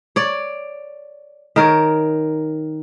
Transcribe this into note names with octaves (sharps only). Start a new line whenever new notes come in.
C#5 D5
D#3 A#4 C#5